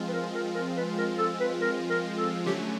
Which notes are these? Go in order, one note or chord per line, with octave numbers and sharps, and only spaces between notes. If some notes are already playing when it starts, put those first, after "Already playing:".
Already playing: F3 G#3 C4 F4
B4
A#4
A#4
A#4
B4
A#4
A4
B4
A#4
A#4
A4
D3 F#3 A3 C#4 G4